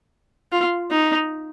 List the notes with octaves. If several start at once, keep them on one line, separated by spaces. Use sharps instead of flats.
F4
D#4